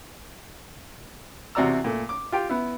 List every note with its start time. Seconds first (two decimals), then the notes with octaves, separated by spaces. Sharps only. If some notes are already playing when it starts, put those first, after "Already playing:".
1.55 E2 C3 F#4 D5 A#5 E6
1.84 A#2 A3
2.09 D6
2.32 F4 G4 G5
2.49 B3 E4